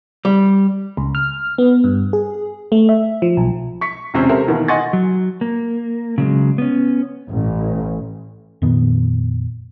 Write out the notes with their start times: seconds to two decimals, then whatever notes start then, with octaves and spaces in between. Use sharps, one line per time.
0.25 G3
0.97 C#2
1.15 F6
1.58 B3
1.84 G2
2.13 G#4
2.72 A3
2.89 E5
3.22 F3
3.37 B1
3.81 C#6 B6 C#7
4.14 E1 C3 C4 C#4
4.29 G4 A4 A#4 C5 E5
4.48 B2 D#3 E3 A#3
4.68 D#5 F#5 G#5 C6 C#6 A6
4.93 F#3
5.41 A#3
6.18 C#3 F#3 G#3
6.58 B3 C#4
7.29 A1
8.62 F2 A#2 D#3 B3